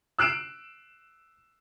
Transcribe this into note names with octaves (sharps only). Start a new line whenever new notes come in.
E6 F#6 C7 D7 E7